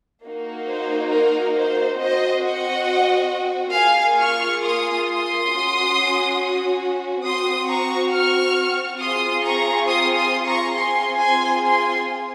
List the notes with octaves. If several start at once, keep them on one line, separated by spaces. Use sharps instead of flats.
A#3 D#4 F#4
C5
A#4
C5
C4 F#4 C5 D#5
D#5 F#5
A#3 F4 G#4 F5 G#5
C#6 F6
C6 D#6
C6 D#6
C#4 F#4
C4 F#4 C6 D#6
A#5 C#6
C#6 F6
C4 F4 G#4 C6 D#6
A#5 C#6
C6 D#6
C6 D#6
A#5 C#6
C4 F4 G#4 G#5 C6
G#5 C6
G#5 C6